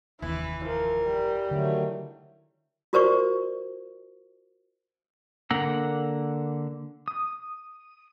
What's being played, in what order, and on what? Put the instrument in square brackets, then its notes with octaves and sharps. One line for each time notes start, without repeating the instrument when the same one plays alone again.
[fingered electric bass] F1 D#2 [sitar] E3 [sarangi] E4
[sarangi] F3 [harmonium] A#4
[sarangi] G3
[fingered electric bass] D3 D4 [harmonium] D#3 F#3 A3
[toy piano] F4 F#4 A#4 C5 D5 C#6
[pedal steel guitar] D3 A#3 F#5 A#5 E6
D#6